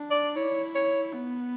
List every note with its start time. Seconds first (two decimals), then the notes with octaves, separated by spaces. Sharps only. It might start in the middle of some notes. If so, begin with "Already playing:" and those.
Already playing: D4
0.11 D5
0.36 E4 C#5
0.75 C#5
1.13 B3